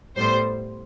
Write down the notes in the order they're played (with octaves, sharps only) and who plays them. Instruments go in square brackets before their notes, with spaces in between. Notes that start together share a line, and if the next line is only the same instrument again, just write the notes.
[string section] A2 G3 B3 C5